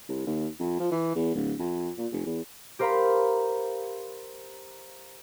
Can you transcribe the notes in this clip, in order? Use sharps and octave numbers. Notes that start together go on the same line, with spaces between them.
C2
D#2
F2
F3
E3
E2
D1
F2
A#2
F1
E2
G4 A#4 C5 F5 A#5 B5